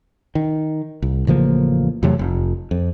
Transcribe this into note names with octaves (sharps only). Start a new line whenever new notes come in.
D#3
C2
A1 C#3 F3 A#3
E2 C3 F#3 A3
F1
F2